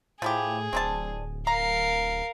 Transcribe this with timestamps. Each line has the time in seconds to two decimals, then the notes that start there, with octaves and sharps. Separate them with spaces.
0.22 A2 F3 E4 G4 G#4
0.73 D1 C4 D4 A5
1.47 A#4 F5 A#5